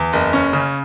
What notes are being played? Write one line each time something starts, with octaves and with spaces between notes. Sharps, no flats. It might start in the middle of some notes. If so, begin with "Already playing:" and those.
Already playing: E2
F#1
C#4
C#3